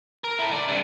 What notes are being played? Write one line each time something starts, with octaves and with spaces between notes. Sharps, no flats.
A#4
E4 A4
D3 D5
G2 C3